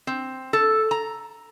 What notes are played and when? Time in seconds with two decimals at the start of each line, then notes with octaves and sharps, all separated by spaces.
0.07 C4
0.53 A4
0.91 A#5